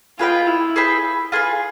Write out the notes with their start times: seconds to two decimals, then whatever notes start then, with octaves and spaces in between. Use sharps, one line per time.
0.19 F4 G#4 B4 D#5 G5
0.47 E4
0.76 G#4 B4 E5 G5
1.32 F4 G#4 B4